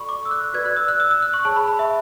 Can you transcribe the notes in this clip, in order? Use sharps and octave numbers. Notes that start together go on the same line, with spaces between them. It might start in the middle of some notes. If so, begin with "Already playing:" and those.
Already playing: F#4 A4 D5 B5 C#6
D6
E6
F#6
F#4 B4 D5 G#6
F#6
E6
F#6
E6
E6
F#6
C#6
G#4 C#5 A5
B5
B5
E5